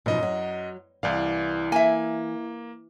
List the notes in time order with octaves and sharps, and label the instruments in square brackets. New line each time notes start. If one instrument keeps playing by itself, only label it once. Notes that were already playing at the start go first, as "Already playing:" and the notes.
[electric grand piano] F#2 D#5 [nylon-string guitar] B2 F3 D#4
[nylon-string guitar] F#3
[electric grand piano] C2 D5 F5 [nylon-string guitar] E3
[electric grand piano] A#3 [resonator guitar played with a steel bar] E5 G#5